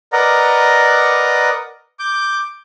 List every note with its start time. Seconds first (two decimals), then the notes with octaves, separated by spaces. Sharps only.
0.13 A#4 B4 D5 D#5 F#5 A#5
1.99 D6 G6